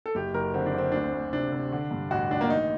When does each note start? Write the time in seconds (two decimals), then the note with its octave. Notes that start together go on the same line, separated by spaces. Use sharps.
0.06 A4
0.15 F#1 G4
0.34 F#1 A#4
0.54 D3 C4
0.66 D4
0.74 D3 C4
0.92 D2 D4
1.03 C4
1.13 D2
1.33 C3 D4
1.52 C3
1.72 D3
1.91 G2
2.11 A1 F#4
2.31 A1 D4
2.41 A#3
2.50 D#3 D#4